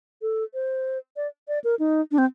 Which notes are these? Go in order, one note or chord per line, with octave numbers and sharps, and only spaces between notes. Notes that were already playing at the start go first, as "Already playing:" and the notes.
A4
C5
D5
D5
A#4
D#4
D4
C4